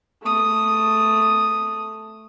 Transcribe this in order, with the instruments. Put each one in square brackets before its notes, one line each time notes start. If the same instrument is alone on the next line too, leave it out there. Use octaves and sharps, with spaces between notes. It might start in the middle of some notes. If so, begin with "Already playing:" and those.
[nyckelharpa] A3 D#6